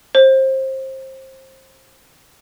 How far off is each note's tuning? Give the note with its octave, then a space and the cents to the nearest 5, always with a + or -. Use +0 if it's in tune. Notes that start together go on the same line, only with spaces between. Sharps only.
C5 +25